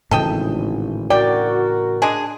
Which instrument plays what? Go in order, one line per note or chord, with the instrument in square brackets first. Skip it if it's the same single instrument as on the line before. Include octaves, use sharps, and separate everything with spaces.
[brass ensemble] G#1 [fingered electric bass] A2 C#3 E3 [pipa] A4 D#5 G5
[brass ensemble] F#4 A#4 [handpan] D5 [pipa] G5
[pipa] G#3 D4 G#4